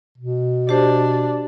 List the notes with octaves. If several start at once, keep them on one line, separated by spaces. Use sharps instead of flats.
B2
D4 G4 C5